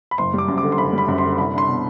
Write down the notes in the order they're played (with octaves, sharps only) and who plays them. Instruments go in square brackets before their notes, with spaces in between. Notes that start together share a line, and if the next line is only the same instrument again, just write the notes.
[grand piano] B5
F#1 C6
G3 D6
F#2
D6
D3
C6
F#1 B5
G3 B5
F#2
C6
D3
C2 B5
D4 C6
B2